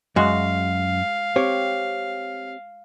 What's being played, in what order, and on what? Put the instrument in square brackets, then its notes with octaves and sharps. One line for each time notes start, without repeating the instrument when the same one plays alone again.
[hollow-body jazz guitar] F#2 [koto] G#3 F#4 [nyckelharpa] F5
[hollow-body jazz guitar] C4 G4 C#5